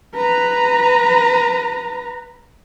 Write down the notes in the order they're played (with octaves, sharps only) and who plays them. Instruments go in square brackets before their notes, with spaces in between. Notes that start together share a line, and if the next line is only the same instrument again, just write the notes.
[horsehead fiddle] B4 A#5